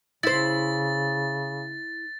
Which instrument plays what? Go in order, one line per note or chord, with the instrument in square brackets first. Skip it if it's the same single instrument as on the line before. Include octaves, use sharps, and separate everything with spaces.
[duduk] C#3 [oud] E4 C5 [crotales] A6